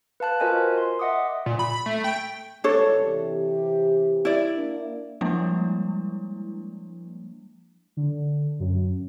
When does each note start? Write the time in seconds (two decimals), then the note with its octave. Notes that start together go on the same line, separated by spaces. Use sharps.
0.20 B4 F5 A5 F#6
0.40 F4 F#4 A#4 C5 D#5 G#5
0.77 C6
0.99 D#5 E5 F#5 D6 D#6
1.46 A#2
1.59 B5
1.72 B5
1.86 A3
2.04 G5
2.64 C#2 G2 D4 A4 C#5
2.98 C3 E3 G4
4.25 E4 D5
4.56 A#3 D4
5.21 F3 G3 G#3 A#3 D4 E4
7.97 D3
8.60 F#2